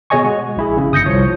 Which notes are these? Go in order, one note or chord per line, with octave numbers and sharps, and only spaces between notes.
B2 G#4 C#5 D#5 G#5 C#6
G#3 F#4
A#1 E4 G#4
C#3
G1 D#6 G6 A#6 C#7
C2 F3 C#5